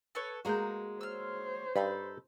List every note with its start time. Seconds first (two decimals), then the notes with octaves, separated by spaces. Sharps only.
0.15 A4 B4 C#5
0.45 G#3 A#3 F#4 B4 A#5 G6
1.01 C5 C#5 E6 F6
1.76 G2 D#4 A4 B5